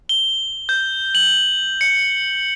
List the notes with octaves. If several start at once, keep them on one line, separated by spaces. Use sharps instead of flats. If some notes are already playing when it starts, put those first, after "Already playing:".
G7
G6
F#7
C#7